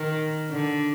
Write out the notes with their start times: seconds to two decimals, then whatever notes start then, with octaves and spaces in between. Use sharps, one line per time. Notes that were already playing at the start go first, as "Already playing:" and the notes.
Already playing: D#3
0.51 D3